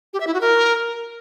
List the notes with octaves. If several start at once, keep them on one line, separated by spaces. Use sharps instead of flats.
G4
E5
E4
F#4
A#4